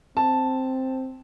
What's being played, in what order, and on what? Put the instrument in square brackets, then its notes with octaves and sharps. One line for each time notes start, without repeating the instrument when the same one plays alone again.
[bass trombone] C4 [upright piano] A5